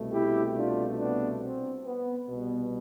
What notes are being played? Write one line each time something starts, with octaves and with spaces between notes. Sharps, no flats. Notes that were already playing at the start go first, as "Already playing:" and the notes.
Already playing: C2 B2 A3
E4 G4
D4 F4
B3 D4
C4
B3
C2 B2 G3 B3